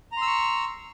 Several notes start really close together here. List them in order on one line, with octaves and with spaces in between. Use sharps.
A#5 C6 E6 C#6